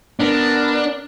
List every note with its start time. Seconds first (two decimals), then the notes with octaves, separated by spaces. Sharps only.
0.20 B3 D4 A#4